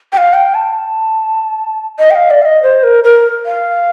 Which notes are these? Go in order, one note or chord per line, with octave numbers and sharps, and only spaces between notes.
G5
F5
G5
A5
D#5
G5
F5
D5
F5
D#5
C5
A#4
A#4
F5